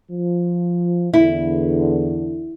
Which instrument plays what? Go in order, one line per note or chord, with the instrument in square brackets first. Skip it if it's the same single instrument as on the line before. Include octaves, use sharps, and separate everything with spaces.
[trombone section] F3
[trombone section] E2 D3 [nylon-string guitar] E4